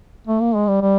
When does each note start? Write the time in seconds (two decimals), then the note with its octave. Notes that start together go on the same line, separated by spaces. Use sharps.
0.27 A3
0.41 A#3
0.55 G#3
0.68 G3
0.82 G3